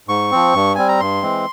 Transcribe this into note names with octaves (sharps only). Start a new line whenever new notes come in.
G#2 C#6
F3 C4
G2
G3 C4 G#5
A#5
G2 C6
E3 G#3 C4